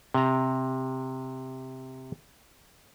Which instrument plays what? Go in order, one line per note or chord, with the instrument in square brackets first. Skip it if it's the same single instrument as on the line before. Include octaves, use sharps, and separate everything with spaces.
[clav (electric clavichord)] C3 A#5